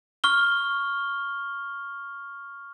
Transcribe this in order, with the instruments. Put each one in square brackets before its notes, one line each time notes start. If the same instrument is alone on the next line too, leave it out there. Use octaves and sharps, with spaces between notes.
[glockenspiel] C#6 F6 G7